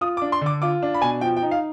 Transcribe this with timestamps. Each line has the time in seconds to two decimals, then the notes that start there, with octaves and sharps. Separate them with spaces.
0.01 F4 D#6
0.17 D6
0.22 D4
0.32 C6
0.41 D3 D6
0.62 F4 D6
0.82 D4
0.94 B5
1.01 B2 G#5
1.21 F3 G5
1.36 G5
1.43 D#4
1.51 F5